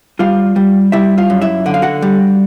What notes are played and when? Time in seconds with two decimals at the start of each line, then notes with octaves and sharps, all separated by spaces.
0.19 G3 F4 F5
0.56 G3
0.92 G3 E4 E5
1.18 F4 F5
1.30 F#2
1.42 E4 E5
1.66 D3 F#5
1.74 F5
1.82 F#4 F#5
2.02 G3